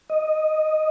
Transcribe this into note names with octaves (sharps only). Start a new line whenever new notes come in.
D#5